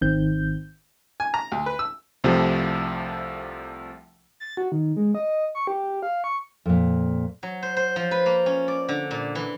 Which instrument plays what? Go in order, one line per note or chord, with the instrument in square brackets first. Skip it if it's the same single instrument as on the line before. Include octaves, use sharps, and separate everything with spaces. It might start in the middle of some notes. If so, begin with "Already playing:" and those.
[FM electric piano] G#1 D#3 C4 G6
[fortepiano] G#5
A#5
D2
B4
E6
[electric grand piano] C2 C3 F3 G3 A3
[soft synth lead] A6
F#4
D#3
G#3
D#5
C#6
G4
F5
C#6
[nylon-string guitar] F2 A#2
[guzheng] F#3
C5
C5
F3
B4
A#3
C#4
D5
D3
A#2
E3